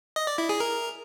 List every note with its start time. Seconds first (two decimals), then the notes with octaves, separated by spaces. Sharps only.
0.16 D#5
0.27 D5
0.38 E4
0.49 G#4
0.60 A#4